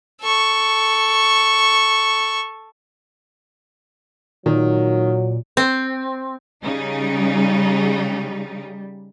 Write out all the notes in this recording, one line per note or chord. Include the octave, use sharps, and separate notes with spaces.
A4 C#6
A#2 D#3 F#3
C4
C#3 G3 D#4